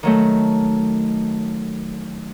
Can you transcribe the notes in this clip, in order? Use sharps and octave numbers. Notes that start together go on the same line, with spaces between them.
D#3 F#3 A3